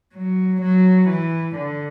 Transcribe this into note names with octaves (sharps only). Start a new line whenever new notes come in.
F#3
F#3
E3
D3